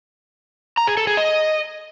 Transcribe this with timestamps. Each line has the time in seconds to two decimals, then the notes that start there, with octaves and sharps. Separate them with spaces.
0.77 A#5
0.87 G#4
0.97 A4
1.07 G#4
1.17 D#5